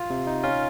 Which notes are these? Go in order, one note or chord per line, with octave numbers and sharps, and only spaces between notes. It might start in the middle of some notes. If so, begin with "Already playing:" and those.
Already playing: F4
C3
D#4
C#4 F4